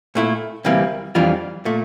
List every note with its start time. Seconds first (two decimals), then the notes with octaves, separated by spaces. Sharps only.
0.15 A#2 A3 E4
0.65 D2 C3 E3 G3 A#3
1.15 F2 E3 G3 D4 F4
1.65 A#2 A3